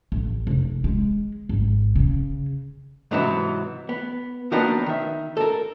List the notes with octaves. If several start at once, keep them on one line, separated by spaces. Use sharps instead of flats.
A1
F1
G#3
G#1
C#3
G#2 C3 E3 F#3 E4
B3
D#3 F3 F#3 A#3 B3 D4
D#3 E5
A4 A#4